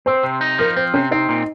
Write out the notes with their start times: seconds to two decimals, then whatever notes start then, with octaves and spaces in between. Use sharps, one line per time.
0.06 C4 C5
0.23 C3
0.41 D#4
0.58 F3 A#4
0.76 C4 C5
0.94 C3 C#4 C#5
1.11 C4 D#4 D#5
1.29 A#2